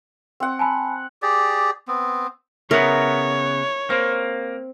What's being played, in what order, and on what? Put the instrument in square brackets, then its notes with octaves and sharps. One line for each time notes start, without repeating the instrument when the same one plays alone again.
[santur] C4 F#5
[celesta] G#5 A5 B5
[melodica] G4 G#4 D5
B3 C4
[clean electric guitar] C#3 B3 [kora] E4 [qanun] A#4 [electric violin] C#5
[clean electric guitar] A#3 [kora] C4